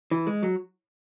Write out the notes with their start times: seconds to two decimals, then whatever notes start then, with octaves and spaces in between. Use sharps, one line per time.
0.11 E3
0.27 G#3
0.43 F#3